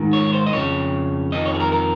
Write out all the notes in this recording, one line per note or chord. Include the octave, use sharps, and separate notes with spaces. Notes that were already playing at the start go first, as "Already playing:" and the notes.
Already playing: G#2 D#3
C#5
C5
D#5
F2 C#3 C#5
F2 D#3 D#5
C#5
G#4
A#4
A#4